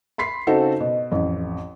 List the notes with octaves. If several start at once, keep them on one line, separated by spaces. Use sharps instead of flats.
B5 C6 B6 C7
C#3 C4 D#4 F#4 A4
B2
A1 F2